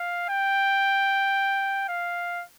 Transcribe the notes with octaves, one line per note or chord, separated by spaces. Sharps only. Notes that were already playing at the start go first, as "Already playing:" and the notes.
Already playing: F5
G5
F5